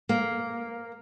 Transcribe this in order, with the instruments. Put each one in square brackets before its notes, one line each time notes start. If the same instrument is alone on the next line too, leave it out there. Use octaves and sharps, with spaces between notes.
[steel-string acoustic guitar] A#3